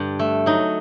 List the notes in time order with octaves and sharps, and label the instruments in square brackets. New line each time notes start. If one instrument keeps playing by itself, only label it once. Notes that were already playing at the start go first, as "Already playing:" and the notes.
Already playing: [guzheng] G2 D3 G3 D4
A3
F#3 D#4